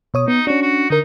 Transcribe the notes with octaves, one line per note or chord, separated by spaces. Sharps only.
B2 C#5 D#6
B3 D#4
C#4 D4 F#4
F#4
D3 D#4 A#4